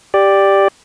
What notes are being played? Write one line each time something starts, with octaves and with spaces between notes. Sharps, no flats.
G4 D5